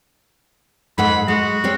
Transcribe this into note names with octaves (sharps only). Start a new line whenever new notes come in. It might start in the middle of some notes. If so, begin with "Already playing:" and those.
G#2 A4 F#5 B5
G#3 F#4
G3 C4 C#5